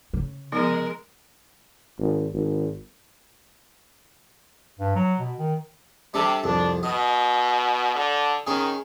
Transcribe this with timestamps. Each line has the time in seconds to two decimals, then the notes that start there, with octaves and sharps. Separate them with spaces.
0.14 C#3
0.52 F3 G#3 B3 D#4 A#4
1.99 G#1
2.34 G#1
4.79 G2
4.96 F#3
5.20 B2
5.39 D#3
6.14 C3 G3 D4 A4
6.44 C2 F2 D4
6.83 B2 D#5
7.95 D3
8.47 D#3 C#4 G#4